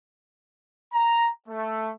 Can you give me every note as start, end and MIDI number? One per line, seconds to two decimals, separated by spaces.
0.94 1.29 82
1.48 1.92 57